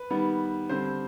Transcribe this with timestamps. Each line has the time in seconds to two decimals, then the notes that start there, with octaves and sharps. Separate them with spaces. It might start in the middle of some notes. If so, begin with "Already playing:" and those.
Already playing: B4
0.10 D#3 G3 B3
0.69 D3 G3 C4 C5